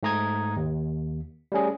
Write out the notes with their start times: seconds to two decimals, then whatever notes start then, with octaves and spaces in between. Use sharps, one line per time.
0.03 G#2 A3 A#5 D#6 G#6
0.56 D#2
1.52 G3 A3 C#4 G#4